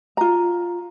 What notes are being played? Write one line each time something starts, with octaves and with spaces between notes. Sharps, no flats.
F4 A#5